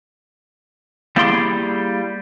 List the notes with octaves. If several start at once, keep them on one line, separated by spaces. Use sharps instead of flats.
G3 A#3 E4 G#4 D5 C6